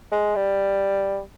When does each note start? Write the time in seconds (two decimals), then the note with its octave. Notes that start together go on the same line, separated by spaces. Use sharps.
0.12 G#3
0.36 G3